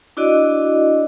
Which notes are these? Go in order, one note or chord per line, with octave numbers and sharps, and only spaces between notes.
D4 E4 F#4 D5 D#5